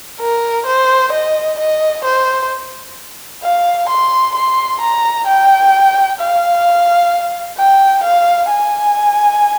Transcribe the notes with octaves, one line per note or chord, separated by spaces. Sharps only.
A#4
C5
D#5
D#5
C5
F5
C6
C6
A#5
G5
F5
G5
F5
G#5